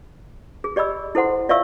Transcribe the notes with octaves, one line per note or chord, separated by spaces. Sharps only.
G#4
G4 D5 D#5 B5 E6
E4 A4 C5 F#5 C6
F4 D5 E5 F5 C#6 E6